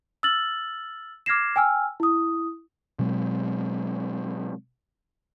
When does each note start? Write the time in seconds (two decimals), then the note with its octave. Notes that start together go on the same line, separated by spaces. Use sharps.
0.23 E6 F6 A6 F#7
1.26 D6 F6 G#6 A#6 C7 E7
1.56 G5 G#5 E6 F6
2.00 E4 D#6
2.99 B2 F#3 G#3 C4